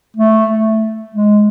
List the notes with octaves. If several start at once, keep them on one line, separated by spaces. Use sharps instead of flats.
A3
G#3